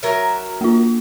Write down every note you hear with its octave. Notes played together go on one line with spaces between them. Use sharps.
F#3 A#4 E5
A#3 F4